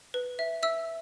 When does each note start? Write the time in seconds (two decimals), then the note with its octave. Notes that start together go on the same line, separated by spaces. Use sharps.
0.14 B4
0.39 E5
0.63 E5 E6